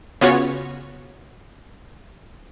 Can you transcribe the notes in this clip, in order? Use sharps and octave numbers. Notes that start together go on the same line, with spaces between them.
C#3 B3 F4 F#4 C#5